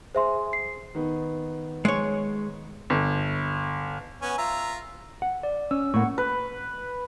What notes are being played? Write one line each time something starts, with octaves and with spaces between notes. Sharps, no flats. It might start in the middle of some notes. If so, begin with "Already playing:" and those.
G#4 C5 E5 C6
C7
D#3 B3
G#3 C#5
G1
B3 C#4 G#5
F4 E5 A#5
F#5
D5
C#4 E6
A2 A#3 F#5 C#6
B4